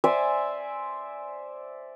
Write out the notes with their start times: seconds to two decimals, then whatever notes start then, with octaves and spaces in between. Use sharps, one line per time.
0.04 C5 D5 E5 G#5